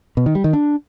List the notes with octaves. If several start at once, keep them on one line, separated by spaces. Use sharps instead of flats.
B2
D#3
G3
D#3
D4